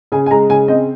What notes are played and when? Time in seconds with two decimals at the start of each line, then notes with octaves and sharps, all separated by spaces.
0.12 C#3 G#5
0.26 G#5
0.31 G#3 A#5
0.49 C#3 G#5
0.68 C4 D#5